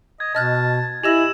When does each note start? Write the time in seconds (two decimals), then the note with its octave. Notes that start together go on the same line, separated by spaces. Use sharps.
0.20 D#5 G#6
0.35 B2 D#5 A5 F6 F#6
1.04 E4 G4 D#5 G#5 E6 A#6 E7 F#7